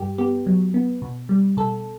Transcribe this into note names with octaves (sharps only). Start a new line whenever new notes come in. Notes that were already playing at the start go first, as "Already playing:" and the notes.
Already playing: G2 G4
B3 G4
F#3
B3
B2
G3
B2 A4